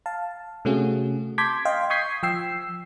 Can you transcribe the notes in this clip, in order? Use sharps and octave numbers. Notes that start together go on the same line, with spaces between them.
F5 A5
C3 A3 C#4 F#4 G#4
A5 C6 D6 G6 G#6 B6
D#5 F5 G5 C6
C#6 D#6 G6 G#6 B6 C7
F3 G5 E6 C7